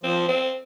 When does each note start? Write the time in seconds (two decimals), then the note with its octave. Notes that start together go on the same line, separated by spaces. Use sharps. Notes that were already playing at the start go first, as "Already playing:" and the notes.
0.03 F3 C4
0.28 C4